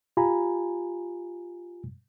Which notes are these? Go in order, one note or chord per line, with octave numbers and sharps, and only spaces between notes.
F4 G4 G#5 A#5 B5